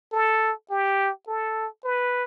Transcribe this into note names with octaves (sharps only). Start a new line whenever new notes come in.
A4
G4
A4
B4